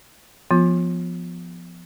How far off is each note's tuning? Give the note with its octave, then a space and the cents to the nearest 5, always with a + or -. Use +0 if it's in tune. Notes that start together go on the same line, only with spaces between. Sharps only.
F3 +0 B3 +0 F4 +15